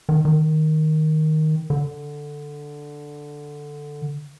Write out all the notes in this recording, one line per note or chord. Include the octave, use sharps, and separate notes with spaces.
D#3
D#3
D3